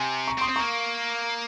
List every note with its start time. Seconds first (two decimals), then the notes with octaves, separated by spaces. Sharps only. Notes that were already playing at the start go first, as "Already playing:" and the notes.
Already playing: C3 G#5 C6
0.28 A#5 C#6
0.38 C4
0.41 C6 D#6
0.49 C4
0.56 A#3 A#5 C#6